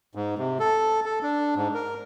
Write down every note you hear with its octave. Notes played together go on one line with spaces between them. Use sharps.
G#2
C3
A4
A4
D4
G#2
A#4